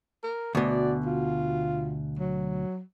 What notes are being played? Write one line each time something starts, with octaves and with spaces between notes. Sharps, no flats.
A#4
D2 B2 D5
F4
F#3